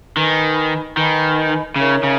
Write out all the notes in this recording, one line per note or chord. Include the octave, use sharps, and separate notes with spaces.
D#3 B4 D#5 G#5 B5
D#3 B4 D#5 G#5 B5
C#3 D#4 A#4 C#5 E5
C#3